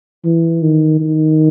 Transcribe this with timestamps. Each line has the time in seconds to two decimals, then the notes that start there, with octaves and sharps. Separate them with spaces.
0.25 E3
0.62 D#3
1.00 D#3